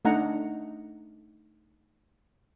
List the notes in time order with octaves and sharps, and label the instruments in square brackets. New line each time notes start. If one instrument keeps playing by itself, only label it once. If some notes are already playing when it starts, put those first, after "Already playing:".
[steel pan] A3 D4 D#4 F#5 A#5